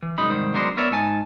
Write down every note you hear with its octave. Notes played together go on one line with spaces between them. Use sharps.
E3
C2 F#2 G#3 D#4 B5
C2 G#2 D#3 C5
F#3 G#3 B3 D4 A#4 C5
B3 A#4 B4 C#5 D5 E5
G#2 D#4 G#5 A5